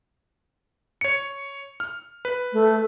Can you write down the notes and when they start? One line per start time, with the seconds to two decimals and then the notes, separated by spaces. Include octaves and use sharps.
1.01 C#5 C#7
1.80 F6
2.25 B4
2.53 A3